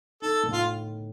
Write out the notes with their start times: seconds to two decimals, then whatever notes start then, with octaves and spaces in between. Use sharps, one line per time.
0.22 D#4 A4
0.43 A2
0.53 F4